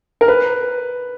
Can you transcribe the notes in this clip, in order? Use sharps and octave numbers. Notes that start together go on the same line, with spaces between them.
A#4
B4